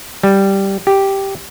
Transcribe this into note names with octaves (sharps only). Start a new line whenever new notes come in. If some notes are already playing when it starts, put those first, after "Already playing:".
G3
G4